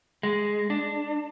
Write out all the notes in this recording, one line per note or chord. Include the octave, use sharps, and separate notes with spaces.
G#3
D4